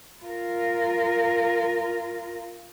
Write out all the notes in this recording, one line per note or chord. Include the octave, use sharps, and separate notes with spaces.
F4 A#4